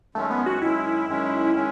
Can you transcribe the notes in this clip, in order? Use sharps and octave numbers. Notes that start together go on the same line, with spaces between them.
F#2 D#3 G#3 A3 C#4
B3
F#4
F#2 D#3 G#3 C#4 E4
F#2 D#3 G#3 C#4
D#3 G#3 C#4